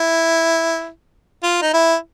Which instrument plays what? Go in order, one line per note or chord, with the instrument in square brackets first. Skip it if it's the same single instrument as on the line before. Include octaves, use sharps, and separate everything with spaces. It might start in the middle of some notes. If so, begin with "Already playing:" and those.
Already playing: [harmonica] E4
F4
D#4
E4